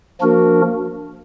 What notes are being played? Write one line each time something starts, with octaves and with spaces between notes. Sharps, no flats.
F3 A#3 D4 F#4 A#4